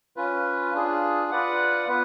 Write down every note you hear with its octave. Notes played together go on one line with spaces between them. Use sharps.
C#4 F4 B4
D4 F4 G#4
F4 B4 D5 F#5
B3 F4 B4